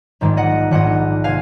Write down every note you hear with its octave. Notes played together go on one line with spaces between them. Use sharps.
A#1 G#2 D#3 G#3
D#5 F#5
A#1 G#2 D#3 G#3 D#5 F#5
C3 F5 G#5